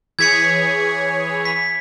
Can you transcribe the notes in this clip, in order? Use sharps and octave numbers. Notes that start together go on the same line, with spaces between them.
E3 G#4 C#5 G#6 B6 C#7
B6